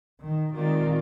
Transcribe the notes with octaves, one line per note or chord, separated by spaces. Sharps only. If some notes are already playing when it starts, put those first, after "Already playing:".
D#3
D#3 G#3 C4 F4 A#4 D5